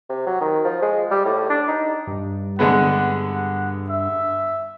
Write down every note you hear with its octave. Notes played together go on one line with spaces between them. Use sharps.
C3
F#3
D#3
F3
G#3
G3
A2
D4
D#4
G2
D3 G#3 B3 F#5
F#5
E5